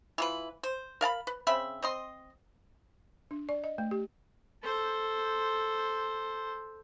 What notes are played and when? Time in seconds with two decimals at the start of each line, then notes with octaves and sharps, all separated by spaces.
0.18 E3 F4 B4
0.63 C5
1.01 A#4 F5 A5 B5
1.27 B4
1.47 C#3 C4 E5 B5
1.82 C4 D#5 C6
3.31 D4
3.49 D5
3.64 D#5
3.78 A3
3.91 G4
4.64 A4 C5